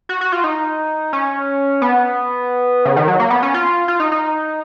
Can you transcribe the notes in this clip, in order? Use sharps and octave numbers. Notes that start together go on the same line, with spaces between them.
F#4
F#4
F4
D#4
C#4
B3
C#3
D#3
F#3
A#3
B3
C#4
F4
F4
D#4
D#4